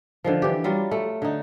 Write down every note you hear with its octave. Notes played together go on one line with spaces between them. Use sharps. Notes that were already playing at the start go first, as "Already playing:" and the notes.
D3 D#3 F3
E3 G4
F#3 G3 F4
A3
D3 D#4